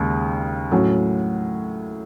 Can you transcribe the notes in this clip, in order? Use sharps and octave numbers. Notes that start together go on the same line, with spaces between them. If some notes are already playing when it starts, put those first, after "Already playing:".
Already playing: D#2 C#3 G#3
A2 F#3 C#4